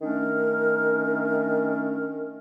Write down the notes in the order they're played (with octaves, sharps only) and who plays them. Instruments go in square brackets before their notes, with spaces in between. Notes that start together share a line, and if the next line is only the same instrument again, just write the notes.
[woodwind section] D#3 A3 C#4 D4 A#4